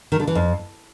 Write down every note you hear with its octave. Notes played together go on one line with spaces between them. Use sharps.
D#3
D3
E3
F2